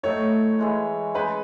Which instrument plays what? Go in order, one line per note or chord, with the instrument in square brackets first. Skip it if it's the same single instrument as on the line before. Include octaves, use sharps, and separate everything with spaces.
[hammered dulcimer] A2 F#3 A3 D#4 [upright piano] C#5
[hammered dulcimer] G#2 E3 G#3
[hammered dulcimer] C#3 G#3 D#4 [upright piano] B4